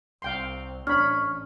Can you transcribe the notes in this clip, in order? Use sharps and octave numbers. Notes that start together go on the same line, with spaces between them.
C2 C4 F5 G5 C6
A1 C#4 D4 B5 F6